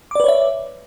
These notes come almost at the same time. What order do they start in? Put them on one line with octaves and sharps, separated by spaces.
D6 D5 B4 C#5 E5